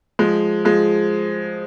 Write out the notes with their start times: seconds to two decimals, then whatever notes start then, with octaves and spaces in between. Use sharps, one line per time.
0.19 F3 G#3
0.65 F3 G#3